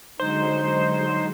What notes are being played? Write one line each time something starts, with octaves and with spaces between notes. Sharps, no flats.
D3 F#3 G#3 D#4 C5